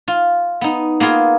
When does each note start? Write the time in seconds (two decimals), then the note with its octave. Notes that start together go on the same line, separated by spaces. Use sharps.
0.08 F4
0.61 B3 D#4
1.00 A#3 B3 F4 G#4